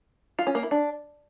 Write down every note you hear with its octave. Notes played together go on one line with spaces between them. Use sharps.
F4
C#4
A#3
E4
D4